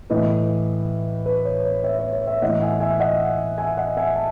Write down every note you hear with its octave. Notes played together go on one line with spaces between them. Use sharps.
A2 E3 B4 D#5
B4
C#5
C#5
C#5 E5
C#5
C#5
C#5 E5
A2 E3 D#5 F#5
E5 G#5
E5 G#5
D#5 F#5
E5 G#5
D#5 F#5
E5 G#5
A5